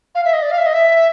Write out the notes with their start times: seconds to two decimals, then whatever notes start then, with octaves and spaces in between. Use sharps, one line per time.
0.15 F5
0.25 E5
0.33 D#5
0.42 D5
0.51 F5
0.58 E5
0.66 D#5
0.74 E5